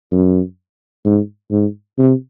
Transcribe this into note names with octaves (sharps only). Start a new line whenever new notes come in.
F#2
G#2
G#2
C3